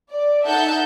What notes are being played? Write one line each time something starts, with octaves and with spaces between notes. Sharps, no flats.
D5
D#4 A4 E5 F#5 A5 G6